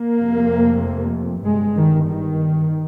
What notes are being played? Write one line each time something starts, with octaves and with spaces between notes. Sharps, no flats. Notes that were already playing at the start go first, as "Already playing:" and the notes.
Already playing: A#3
F1 F2 C3
G1 G2 G#3
D#3
D#3